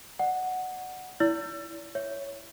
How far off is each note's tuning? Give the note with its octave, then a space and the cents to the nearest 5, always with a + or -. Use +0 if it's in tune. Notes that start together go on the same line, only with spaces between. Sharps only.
D5 +35 F#5 +0
E4 +0 D5 -40 E6 +35
C#5 +5 E5 +0